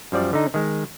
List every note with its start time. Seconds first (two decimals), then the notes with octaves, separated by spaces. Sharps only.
0.12 F#2 F3 G3 D5
0.33 D3 D#4
0.54 D#3 G#3